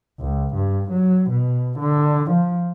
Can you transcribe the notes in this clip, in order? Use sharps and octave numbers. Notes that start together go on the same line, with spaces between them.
C#2
G2
F#3
B2
D3
F3